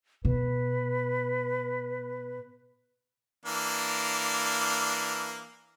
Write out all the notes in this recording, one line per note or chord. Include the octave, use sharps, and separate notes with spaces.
B2 B4
E3 A#3 D4